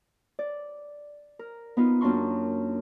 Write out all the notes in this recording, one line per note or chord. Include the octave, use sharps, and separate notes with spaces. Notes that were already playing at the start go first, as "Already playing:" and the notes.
D5
A#4
B3 D#4 F4
F#2 A#3 D4 D#4 C6 C#6